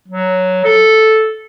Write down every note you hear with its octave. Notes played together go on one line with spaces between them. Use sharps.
F#3
A4